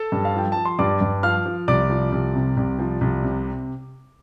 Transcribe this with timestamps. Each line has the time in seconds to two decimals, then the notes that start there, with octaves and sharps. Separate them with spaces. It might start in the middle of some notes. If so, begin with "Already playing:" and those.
Already playing: A4 A5
0.12 G2
0.25 F5
0.34 F3 G5
0.52 F3 A5
0.65 C6
0.79 G2 D5 D6
1.01 G2
1.23 F3 F5 F6
1.46 F3
1.68 C2 D5 D6
1.90 F3
2.12 C2
2.35 C3
2.57 C2
2.79 F3
3.01 C2
3.23 C3